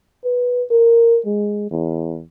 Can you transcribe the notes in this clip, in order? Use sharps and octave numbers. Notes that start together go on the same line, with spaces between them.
B4
A#4
G#3
E2